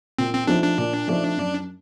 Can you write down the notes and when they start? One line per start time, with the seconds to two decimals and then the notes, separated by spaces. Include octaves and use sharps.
0.19 A#2 C4
0.33 C4
0.47 F3 A3 C4 D4 D#4
0.63 D4
0.78 A#2
1.07 F3 A3 C4 D#4
1.37 F#2